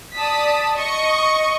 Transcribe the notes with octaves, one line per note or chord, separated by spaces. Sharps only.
D5 A5 D#6 B6
D#5 C#6 C#7